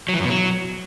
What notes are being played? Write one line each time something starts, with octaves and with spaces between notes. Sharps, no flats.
F#3
E3
F#2
B2
F#3